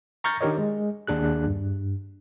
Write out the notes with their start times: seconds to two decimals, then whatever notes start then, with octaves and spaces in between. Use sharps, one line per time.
0.24 A#5 C#6 F6 G6 A6 A#6
0.41 D#3 D4 G4 A#4 C#5 D#5
0.58 G#3
1.07 D#2 D4 G#4 F#6
1.47 G2